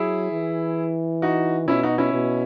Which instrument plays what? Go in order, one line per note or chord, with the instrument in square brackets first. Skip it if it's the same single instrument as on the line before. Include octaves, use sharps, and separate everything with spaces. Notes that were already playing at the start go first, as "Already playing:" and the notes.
Already playing: [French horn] F#3 [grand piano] E4 G#4
[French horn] E3
[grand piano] D#4 F#4
[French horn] B2 [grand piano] C#4 E4
[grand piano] D#4 F#4
C#4 E4
[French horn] B2